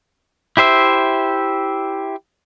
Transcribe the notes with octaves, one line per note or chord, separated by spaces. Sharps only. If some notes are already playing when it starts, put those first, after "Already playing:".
E4 G4 C5 E5